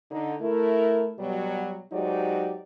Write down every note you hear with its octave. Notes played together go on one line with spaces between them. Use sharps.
D3 D#4
A3 E4 A#4
B2 F#3 G3
F#3 G#3 D#4 G4 C5 D5